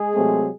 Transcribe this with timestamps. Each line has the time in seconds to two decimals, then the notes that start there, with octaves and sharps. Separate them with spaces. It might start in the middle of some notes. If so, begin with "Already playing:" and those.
Already playing: G#3 G#4
0.13 C3 F#3 A3 C4